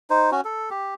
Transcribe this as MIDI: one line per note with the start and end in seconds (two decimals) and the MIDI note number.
0.10 0.30 63
0.10 0.30 72
0.31 0.41 61
0.31 0.41 66
0.45 0.70 69
0.70 0.94 67